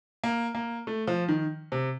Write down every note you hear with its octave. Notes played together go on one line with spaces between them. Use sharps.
A#3
A#3
A3
F3
D#3
C3